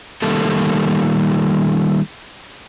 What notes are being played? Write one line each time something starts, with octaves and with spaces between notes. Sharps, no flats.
D#3 G3 A3 A#3 A4